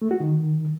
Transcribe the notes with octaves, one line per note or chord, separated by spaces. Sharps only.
A3
F#4
D#3